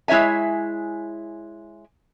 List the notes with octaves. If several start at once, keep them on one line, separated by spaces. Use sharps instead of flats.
G#3 E4 C#5 E5 G#5